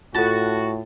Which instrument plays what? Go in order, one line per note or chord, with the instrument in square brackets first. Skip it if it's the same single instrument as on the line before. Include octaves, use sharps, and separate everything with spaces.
[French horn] A2 [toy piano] F4 A4 [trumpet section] F#4 [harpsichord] A5